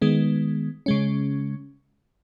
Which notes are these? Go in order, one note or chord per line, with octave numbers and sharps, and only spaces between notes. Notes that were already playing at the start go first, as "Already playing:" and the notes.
D#3 G#3 B3
C#3 G#3 C#4